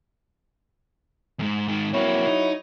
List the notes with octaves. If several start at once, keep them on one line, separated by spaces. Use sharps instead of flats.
E2 G#2
G#2 D#3
F#3 A#3 C4 E4 C#5
D#4